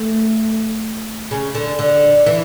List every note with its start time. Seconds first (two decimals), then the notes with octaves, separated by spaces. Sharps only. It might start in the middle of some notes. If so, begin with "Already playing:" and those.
Already playing: A3
1.31 C#3
1.55 D3
1.79 D3
2.26 E3